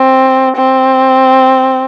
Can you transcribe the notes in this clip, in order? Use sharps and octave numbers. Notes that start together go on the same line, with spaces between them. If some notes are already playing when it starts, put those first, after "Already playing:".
Already playing: C4
C4